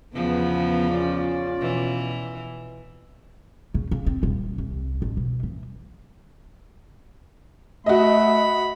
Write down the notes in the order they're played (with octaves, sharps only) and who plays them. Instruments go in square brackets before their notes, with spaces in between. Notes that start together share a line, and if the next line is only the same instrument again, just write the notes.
[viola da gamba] E2 C#3 F3 [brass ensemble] B3
[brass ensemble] C#4 F4 D5
[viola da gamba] B2 E3
[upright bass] C#3
C#3
C4
D#1
C2
A1
B2
E3
[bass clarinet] A3 [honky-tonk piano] F#4 D#5 [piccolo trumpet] B5